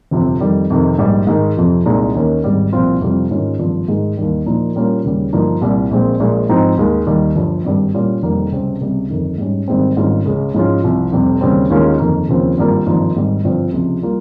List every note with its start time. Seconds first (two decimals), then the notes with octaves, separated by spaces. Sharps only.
0.11 G1 F2 C3 F3 C4
0.40 F2 D#3 G3
0.70 F2 C3 D#3
0.98 A#1 G#2 G3
1.27 G#2 D#3 G#3
1.57 F2 C3 F3
1.86 C2 A#2 G#3 D#4
2.15 D#2 D#3 A#3 C#4
2.44 G#1 G#2 G3
2.73 C2 A#2 F3 C4 F4
3.01 F2 C3 G3 C4 F4
3.31 G#2 D#3 G#3 C#4 F4
3.59 G#1 G2 F3
3.88 G#2 D#3 G#3
4.17 D#2 D#3 G3
4.46 A#2 F3 A#3 D#4
4.75 A#2 G3 A#3 C#4 F4
5.04 D#2 C#3 G3
5.33 G1 G2 F3 A#3 D#4
5.62 C2 A#2 G3
5.91 A#1 A#2 G#3 C4
6.20 A#1 A#2 G#3
6.49 G#2 F3 C4 D#4
6.77 D#2 D#3 G#3
7.07 D#2 D#3 G3
7.36 G1 G2 F3
7.64 G#1 G2 G3
7.94 A#2 G3 C#4 F4
8.22 F1 F2 D#3 G3 A#3
8.52 C#2 C3 G3 C4
8.81 C#2 C3 G3
9.10 G1 F2 D#3
9.38 G#2 G3 C#4
9.68 G#1 G#2 G3 C4
9.96 G#1 G#2 G3 C#4 F4
10.26 C#2 C#3 G#3
10.54 G#2 F3 G#3 C#4 F4
10.83 C2 C3 F3
11.12 F1 F2 C3 G3
11.41 D#2 C#3 G3 C4
11.70 D#2 D#3 G#3 C#4 F4
11.99 G1 F2 D#3 A#3
12.29 D#2 C#3 F3 C4
12.57 G#1 G2 G3 A#3 F4
12.86 G#1 G2 F3 A#3 D#4
13.15 G#1 G#2 G3
13.44 G1 G2 F3 C4 F4
13.73 C#2 C3 F3
14.02 G3 A#3 F4